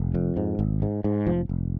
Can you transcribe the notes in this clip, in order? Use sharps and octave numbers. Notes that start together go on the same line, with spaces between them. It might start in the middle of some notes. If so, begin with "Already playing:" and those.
Already playing: F1
F2
G#2
G#1
G#2
G#2
F1 F3
F1